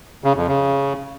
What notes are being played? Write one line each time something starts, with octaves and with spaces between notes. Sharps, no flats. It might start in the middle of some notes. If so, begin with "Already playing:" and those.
C#3
F2
C#3